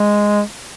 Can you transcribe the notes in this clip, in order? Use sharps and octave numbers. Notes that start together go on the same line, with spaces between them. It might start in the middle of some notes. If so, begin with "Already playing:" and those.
Already playing: G#3